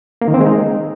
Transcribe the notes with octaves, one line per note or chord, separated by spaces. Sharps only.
A#3
D#3
C4
G#3
D#4